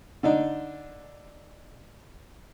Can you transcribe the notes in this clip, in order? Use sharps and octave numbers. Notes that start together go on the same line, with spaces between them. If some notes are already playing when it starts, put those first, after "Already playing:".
D3 D4 D#4